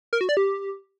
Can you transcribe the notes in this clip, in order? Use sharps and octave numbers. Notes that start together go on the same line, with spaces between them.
A#4
F#4
D5
G4